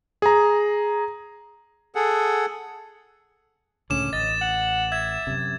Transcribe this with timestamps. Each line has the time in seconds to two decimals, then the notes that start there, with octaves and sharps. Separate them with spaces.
0.22 G#4 A#5
1.95 G#4 A4 F#5
3.90 C#2 A2 D3 C#4 D6 E7
4.13 A1 D#5 A6
4.41 F#5
4.92 E5 G#6
5.27 F#2 C3